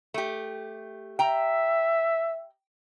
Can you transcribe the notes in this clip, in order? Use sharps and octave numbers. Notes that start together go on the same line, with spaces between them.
A3 G4
E5 G5 A#5